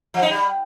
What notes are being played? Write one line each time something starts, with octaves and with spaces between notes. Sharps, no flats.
F3
D#4
G3